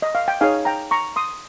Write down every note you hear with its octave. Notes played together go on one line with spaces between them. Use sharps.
D#5
F5
G5
D#4 G#4 C#5 F5 G#5
G5 A#5
A#5 C#6
C6 D#6